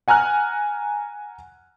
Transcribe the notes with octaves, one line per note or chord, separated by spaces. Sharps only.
F#5 G#5 A#5 F6 F#6